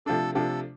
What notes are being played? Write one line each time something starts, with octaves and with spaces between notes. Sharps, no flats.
C3 F3 A3 D4 A4
C3 F3 A3 D4 A4